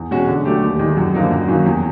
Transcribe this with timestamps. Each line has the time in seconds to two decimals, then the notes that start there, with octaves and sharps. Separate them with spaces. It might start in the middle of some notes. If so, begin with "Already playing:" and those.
Already playing: E2
0.11 B2 G#3 C#4 F#4
0.27 D3
0.45 F#3 A3 D4 G4
0.62 D#2
0.79 D#3 G#3
0.97 F#2
1.14 D3 F3 A#3 D#4
1.31 F#2
1.48 D#3 F#3 A#3 C#4
1.66 E2